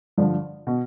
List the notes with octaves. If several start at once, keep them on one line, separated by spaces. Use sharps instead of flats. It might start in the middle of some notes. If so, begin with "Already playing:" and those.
G2 D3 F3
B2